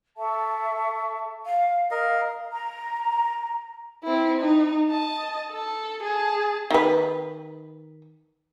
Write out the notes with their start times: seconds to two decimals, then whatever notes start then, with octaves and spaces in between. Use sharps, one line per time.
0.16 A4 E5 A5 C#6
1.46 F5
1.91 A#4 D#5 F5
2.52 A#5
4.04 C4 E4
4.39 D#4
4.90 D#5 A5
5.52 A4
6.03 G#4 A5
6.71 D#3 B4